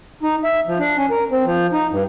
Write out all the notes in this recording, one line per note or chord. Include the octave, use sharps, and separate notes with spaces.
D#4
E5
F3
D4
C#4
A#4
C4
F3
D#4
G2